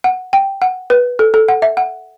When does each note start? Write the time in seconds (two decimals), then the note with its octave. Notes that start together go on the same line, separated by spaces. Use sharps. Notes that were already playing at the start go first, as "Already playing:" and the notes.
0.04 F#5
0.33 G5
0.62 F#5
0.90 B4
1.19 A4
1.34 A4
1.48 F#5
1.62 E5
1.77 F#5